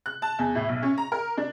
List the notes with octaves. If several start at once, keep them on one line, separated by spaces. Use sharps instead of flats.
F#6
A5
E2
A2
B1
C#4
A#5
A#4
D4